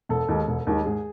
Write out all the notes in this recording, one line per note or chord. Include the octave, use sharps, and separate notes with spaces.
E1 A4
D#2 D#3 G#3 D#4
E1
D#2 D#3 G#3 D#4
G#2 G#4